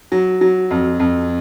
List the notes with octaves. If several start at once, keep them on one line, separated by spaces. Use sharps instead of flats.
F#3
F#3
F2
F2